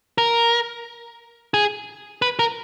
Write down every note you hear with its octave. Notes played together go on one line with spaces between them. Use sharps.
A#4
G#4
B4
A#4